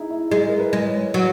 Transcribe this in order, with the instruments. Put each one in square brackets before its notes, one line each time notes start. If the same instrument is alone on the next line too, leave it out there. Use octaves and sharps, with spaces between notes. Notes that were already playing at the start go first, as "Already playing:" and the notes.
Already playing: [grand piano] D#4 E4 G#4
E4
[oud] G#3 [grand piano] G#4
[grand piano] A#4
B4
[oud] G#3
[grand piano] C#5
[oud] F#3